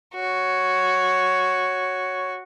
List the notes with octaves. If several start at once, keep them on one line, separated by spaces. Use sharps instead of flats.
F#4 C#5